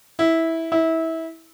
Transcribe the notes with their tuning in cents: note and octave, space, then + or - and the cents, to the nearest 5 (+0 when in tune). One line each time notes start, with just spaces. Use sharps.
E4 -15
E4 -25